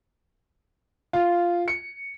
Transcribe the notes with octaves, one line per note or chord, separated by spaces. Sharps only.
F4
C#7